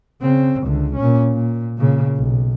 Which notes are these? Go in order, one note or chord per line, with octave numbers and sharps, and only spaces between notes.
C#3 C4
C#2 D3
A#2 C#4
A#2
A#2 C#3
B1